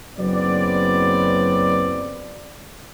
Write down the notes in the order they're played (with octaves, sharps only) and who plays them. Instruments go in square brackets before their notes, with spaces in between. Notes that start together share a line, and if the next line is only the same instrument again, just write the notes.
[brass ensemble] F#1 F#3 B3 C4 D5